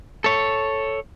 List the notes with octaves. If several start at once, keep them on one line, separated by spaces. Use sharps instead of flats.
A4 C#5